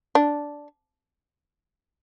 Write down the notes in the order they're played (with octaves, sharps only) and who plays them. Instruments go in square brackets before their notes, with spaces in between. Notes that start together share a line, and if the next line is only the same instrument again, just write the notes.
[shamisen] D4